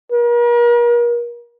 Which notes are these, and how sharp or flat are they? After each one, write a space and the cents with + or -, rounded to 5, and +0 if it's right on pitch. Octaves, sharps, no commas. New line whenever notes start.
A#4 +40